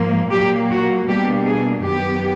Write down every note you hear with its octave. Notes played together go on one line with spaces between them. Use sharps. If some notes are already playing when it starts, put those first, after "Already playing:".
Already playing: G#2 F3 A#3
A#2 F#3 A#3 G4
F#4
B2 G3 A#3 D4 G4
G#4
F#2 D#3 F#3 B3 G4